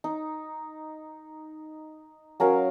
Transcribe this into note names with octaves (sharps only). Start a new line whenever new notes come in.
D#4
F#3 C#4 A#4 F5